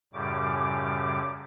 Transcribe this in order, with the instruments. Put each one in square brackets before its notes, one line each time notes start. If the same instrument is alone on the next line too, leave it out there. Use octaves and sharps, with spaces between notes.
[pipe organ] F#2 A2 C#3 G3 D6